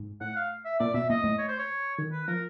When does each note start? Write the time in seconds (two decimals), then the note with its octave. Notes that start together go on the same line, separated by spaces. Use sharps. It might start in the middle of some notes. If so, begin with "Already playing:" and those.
Already playing: G#2
0.21 A2 F#5
0.36 F5
0.65 E5
0.80 A#2 D5
0.94 B2 E5
1.09 A#2 D#5
1.24 A2
1.38 C#5
1.48 C5
1.59 C#5
1.98 D#3
2.12 B4
2.27 F3 A#4